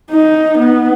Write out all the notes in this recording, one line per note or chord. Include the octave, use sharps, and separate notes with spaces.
D#4
B3